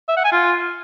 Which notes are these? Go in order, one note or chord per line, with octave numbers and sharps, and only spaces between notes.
E5
F#5
G#5
F4